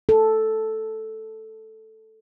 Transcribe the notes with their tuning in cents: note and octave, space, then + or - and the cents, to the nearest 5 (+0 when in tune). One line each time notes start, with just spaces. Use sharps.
A4 +0